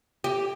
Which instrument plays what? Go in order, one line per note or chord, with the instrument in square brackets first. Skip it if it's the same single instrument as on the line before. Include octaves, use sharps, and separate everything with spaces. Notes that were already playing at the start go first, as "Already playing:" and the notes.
[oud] G4